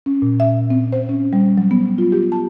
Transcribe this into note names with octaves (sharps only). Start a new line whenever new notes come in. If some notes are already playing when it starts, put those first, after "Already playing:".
C#4
A#2
E5
C4
C5
C#4
G3
F#3
B3
F4
G4
A5